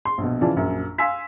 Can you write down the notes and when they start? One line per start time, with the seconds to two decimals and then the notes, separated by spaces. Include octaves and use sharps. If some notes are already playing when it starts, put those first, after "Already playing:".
0.05 C6
0.18 A#1 B2
0.41 C#3 E3 F3 F4 D5 A5
0.56 A#1 F#2
0.98 F5 G#5 C6 E6 B6